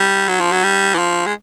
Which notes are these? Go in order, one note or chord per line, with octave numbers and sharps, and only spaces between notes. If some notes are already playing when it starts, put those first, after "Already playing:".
Already playing: G3
F#3
F3
F#3
G3
E3
F3
G#3